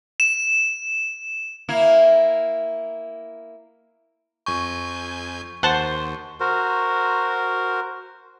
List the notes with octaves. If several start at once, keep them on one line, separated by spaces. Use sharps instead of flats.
E7
A#3 E4
F2 G#5 C#6 G6
D#2 C5 F#5 A5
F#4 A#4 C5